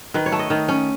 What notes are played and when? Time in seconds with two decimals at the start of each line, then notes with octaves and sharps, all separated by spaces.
0.14 D#3 B4
0.26 C#5
0.32 A3
0.39 D#5
0.50 D#3
0.68 C#4